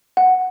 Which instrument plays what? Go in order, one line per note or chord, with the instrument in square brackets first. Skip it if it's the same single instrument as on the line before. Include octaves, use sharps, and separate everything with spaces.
[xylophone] F#5